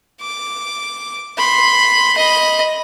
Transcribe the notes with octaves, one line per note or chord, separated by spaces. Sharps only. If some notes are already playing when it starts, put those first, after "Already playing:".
D6
B5 C6
D#5 B5